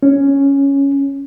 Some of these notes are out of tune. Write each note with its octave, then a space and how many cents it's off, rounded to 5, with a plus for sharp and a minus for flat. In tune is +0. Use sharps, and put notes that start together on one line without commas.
C#4 +0